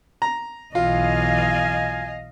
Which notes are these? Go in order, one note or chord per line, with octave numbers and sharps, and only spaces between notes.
A#5
B1 E3 F4 D#5 F5 G#5